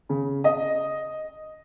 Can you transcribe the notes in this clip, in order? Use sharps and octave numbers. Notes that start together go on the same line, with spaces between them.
C#3
D#5